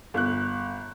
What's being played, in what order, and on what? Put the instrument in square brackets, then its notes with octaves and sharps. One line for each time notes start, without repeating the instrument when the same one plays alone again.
[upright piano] G1 F#6